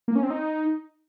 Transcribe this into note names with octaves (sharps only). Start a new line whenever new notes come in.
A#3
C#4
C4
D#4